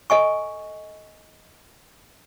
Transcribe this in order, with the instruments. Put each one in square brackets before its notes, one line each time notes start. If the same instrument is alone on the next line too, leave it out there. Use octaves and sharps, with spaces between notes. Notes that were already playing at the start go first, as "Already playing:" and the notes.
[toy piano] A4 D#5 G#5 C#6